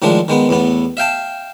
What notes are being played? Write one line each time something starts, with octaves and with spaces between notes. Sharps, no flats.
A2 D#3 F3 G#3 D4
D#3 G#3 B3
E2 A2 B3
E5 F5 G5 A5